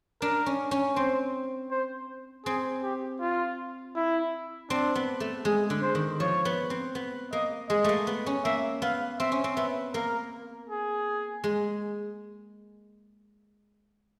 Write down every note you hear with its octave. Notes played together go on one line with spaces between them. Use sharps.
D4 A#4
C#4
C#4
C4 C5
C5
C4 G#4
G4
F4
E4
C4 D4
B3
A3
G#3 G#4
D3
C5
D#3
F3 C#5
B3
C4
B3
A#3 D#5
G#3 D#5
A3 A#3
B3
C#4
A#3 E5
B3 F5
C4 E5
C#4
C4
B3 E5
A#3 A#4
G#4
G#3